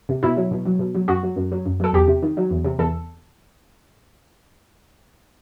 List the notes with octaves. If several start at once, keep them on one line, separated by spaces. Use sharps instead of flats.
C3
B2 E4
F#3
B2
F#3
B2
F#3
F#2 F#4
F#3
F#2
F#3
F#2
F#3 A4
E2 G4
C3
D#3
F#3
E2
C3
E2 A4